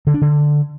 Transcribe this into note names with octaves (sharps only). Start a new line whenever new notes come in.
D3
D4
D3